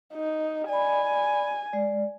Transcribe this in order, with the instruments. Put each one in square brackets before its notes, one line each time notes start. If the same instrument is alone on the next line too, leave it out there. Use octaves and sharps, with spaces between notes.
[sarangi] D#4
[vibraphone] D5 B5 [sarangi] G#5
[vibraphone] G#3 D5